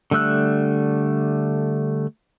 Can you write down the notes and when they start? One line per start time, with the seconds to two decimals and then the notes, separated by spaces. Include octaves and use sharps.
0.11 D3 G3 A3 E6 F#6